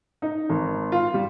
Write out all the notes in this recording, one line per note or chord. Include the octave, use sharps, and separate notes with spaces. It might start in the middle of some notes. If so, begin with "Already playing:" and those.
D#4
G#1
F4
G3